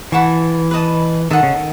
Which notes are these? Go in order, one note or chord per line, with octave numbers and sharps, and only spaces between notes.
E3 B4 F#5 A5 C#6
B4 D#5 A5
D#3 A4 D#5 F#5
C#3
D#3